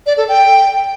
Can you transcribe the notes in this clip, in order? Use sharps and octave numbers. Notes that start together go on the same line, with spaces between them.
D5
A4
G5